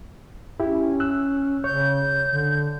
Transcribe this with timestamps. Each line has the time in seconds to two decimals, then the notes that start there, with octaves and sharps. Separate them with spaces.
0.60 C#4 E4 G4
1.00 E6 F#6
1.64 C#3 C#5 G6
2.26 D3